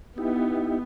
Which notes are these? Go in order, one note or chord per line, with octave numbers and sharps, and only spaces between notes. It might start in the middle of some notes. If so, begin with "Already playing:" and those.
B3 D#4 E4 G4